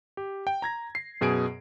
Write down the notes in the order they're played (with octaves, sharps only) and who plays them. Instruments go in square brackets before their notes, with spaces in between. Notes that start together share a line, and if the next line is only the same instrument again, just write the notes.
[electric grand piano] G4
G5
A#5 G#6 A#6
C7
F#2 B2 G#4 G#5 D7